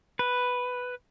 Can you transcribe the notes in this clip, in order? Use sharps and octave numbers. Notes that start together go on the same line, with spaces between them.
B4